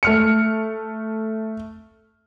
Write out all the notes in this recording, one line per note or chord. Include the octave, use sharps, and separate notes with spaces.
A3 F6 C#7